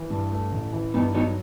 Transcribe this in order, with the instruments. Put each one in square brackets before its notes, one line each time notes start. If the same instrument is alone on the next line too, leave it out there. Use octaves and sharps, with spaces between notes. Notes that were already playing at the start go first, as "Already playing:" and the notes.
Already playing: [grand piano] E3
G2
A3
A1
E3
[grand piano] G2 [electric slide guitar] B3 D#4
[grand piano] F#3 [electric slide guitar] B3 D#4